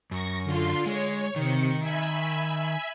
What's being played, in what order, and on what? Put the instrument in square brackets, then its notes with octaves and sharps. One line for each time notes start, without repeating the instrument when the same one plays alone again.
[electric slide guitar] F#2 [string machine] C#6 A#6
[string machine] D3 F4 C6
[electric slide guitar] G#3 [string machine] C#5
[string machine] C3 C#7 [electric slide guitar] D#3
[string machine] E5 G#5 B5